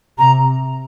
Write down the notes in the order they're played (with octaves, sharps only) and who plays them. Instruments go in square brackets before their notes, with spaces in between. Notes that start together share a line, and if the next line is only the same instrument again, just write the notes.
[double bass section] C3 [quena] A#5